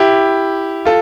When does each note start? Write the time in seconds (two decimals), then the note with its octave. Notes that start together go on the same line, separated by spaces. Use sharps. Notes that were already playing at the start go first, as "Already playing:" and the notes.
Already playing: E4 G4
0.85 F4 A4